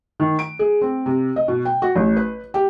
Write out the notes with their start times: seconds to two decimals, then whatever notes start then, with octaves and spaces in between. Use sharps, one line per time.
0.20 D#3
0.39 D7
0.59 G#4
0.82 C4
1.06 C3
1.36 D#5
1.48 B2
1.65 G5
1.82 F#4
1.96 A1
2.17 B4
2.54 G4